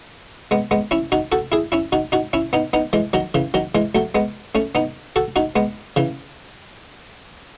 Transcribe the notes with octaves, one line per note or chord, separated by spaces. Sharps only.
G#3 B3
G#3 B3
C#4 E4
D#4 F#4
F#4 A4
E4 G#4
C#4 E4
D#4 F#4
D#4 F#4
C#4 E4
B3 D#4
B3 D#4
E3 G#3
D#3 F#3
C#3 E3
D#3 F#3
E3 G#3
F#3 A3
G#3 B3
A3 C#4
B3 D#4
F#4 A4
D#4 F#4
G#3 B3
C#3 E3